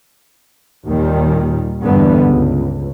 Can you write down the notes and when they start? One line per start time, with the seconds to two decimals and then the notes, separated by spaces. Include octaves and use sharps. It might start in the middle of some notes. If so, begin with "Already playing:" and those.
0.87 D#2 A#2 D#3 G3
1.82 E2 G2 D3 G3 B3
2.26 C#2